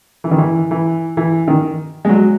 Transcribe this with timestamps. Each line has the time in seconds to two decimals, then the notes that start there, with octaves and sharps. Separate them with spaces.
0.24 E3
0.31 D#3
0.38 E3
0.71 E3
1.17 E3
1.48 D#3
2.05 G#3
2.09 F#3